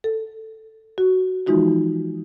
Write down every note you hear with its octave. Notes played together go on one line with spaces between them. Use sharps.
A4
F#4
E3 F3 G#3 D#4 F4 F#4